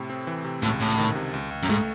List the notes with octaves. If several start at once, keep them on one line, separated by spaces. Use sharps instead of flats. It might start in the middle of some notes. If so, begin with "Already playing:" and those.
Already playing: A2 C3
C4
E3
C3
C#2 A2
C#2 A2
D#3
C3
C#2
C#2
F#2
G#2 A3